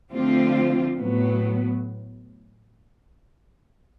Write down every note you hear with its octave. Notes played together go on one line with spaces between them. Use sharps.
D3 F3 A3 C4 F4
A2 F#3 B3